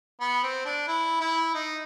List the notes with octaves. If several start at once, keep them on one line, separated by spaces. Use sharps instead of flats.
B3
C4
D4
E4
E4
D#4